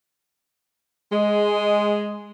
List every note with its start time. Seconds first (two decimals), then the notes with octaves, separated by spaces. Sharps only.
1.13 G#3